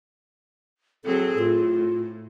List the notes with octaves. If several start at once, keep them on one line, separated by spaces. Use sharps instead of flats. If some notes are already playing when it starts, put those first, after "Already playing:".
F#3 C4 G#4 A4
A2 F4